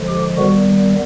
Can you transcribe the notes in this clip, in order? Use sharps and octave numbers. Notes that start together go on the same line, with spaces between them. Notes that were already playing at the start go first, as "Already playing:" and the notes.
Already playing: D3 F3 G#3
G4
D#3 G3 B3 F#4